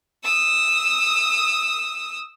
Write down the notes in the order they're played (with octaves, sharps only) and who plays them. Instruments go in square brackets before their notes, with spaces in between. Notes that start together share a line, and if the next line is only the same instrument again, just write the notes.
[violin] D#6 E6